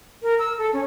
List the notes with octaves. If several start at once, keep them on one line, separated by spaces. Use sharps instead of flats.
A#4
E6
A4
C#4